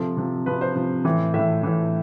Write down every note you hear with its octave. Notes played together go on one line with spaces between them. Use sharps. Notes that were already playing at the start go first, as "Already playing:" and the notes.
Already playing: C3 F3 A4
C3 F3
C3 F3 B4
C5
C3 F3
A2 E3
A2 E3 E5
A2 E3